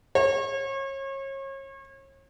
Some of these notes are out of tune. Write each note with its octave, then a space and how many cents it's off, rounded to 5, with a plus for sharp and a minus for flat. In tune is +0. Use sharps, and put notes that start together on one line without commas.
C#5 -35